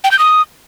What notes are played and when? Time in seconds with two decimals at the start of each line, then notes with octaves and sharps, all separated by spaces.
0.04 G5
0.11 G6
0.19 D#6